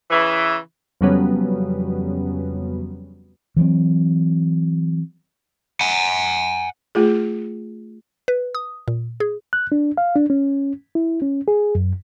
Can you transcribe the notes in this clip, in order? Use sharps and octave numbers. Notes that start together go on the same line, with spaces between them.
C#3 E3
F2 C#3 F#3 G3 B3 C#4
E3 F#3 A#3 C4
F#5 G#5
A3 F4 G#4
B4
D#6
A#2
G#4
F#6
D4
F5
D4
C#4
E4
C#4
G#4
F#2